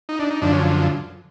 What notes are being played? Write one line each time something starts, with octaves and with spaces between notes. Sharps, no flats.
D#4
D4
D#4
F#2 D3 F3 D4
C#4